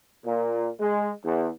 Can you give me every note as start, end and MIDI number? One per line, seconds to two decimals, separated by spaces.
0.24 0.67 46
0.78 1.08 56
1.24 1.47 40